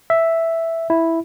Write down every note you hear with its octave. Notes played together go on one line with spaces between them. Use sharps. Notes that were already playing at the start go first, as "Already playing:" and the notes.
E5
E4